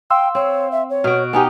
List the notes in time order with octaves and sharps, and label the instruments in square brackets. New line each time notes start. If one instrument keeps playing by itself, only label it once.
[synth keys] F5 C6 E6 [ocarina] G5
[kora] C4 [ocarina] C#5
[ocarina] E5
C#5
[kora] B2 F#4 [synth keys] F6 D7
[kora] B3 D#4 G4 [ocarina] G#5